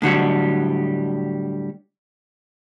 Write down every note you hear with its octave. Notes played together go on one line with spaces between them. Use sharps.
A2 D3 F#3 G3